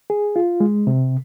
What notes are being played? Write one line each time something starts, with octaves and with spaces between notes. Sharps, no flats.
G#4
F4
G#3
C3